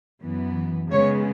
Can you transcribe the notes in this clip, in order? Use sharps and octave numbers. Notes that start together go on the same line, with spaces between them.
F#2 E3 B3
C#3 G#3 B3 C#5